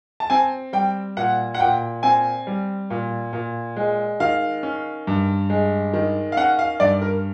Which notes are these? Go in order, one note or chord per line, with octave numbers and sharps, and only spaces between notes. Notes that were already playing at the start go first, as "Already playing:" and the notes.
A5
C4 G#5
G3 G5
A#2 F#5
F#5
A#2 G5
C4 G#5
G3
A#2
A#2
G#3
D#3 F5
C#4
G2
G#3
D#3
F5
C#4 F#5
F5
G2 D5
A#4